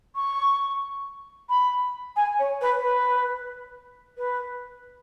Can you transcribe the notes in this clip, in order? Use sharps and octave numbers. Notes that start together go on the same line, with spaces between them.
C#6
B5
G#5
C#5
B4
B4
B4